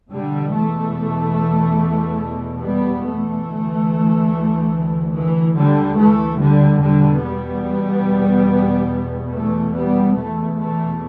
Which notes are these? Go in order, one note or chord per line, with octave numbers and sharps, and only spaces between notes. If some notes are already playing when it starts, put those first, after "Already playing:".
E2 B2 D3 G3
E3 A3
G3 B3
E3 A3
D2
E3
D3 G3
E3 A3
D3 G3
E2 B2 D3 G3
G3 B3
E3 A3
G3 B3
E2 B2 E3 A3
E3 A3